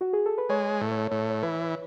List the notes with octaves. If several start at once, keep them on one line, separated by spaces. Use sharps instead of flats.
F#4
G#4
A4
B4
G#3 C#5
C#5
A2
C#5
A2 C#5
C#5
E3 B4